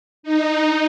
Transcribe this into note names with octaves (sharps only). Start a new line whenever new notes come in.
D#4